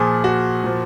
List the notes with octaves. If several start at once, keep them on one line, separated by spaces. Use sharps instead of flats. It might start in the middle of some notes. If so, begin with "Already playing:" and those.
Already playing: A#2 F3 G#4
F#4
A#2 F3